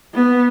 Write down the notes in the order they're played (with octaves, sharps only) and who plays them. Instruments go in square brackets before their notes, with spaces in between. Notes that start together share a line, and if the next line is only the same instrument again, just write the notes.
[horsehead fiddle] B3